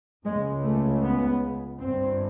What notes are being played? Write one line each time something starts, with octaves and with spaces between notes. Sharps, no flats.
C#2 C#3 G#3
A3
B3
G1 G2 C4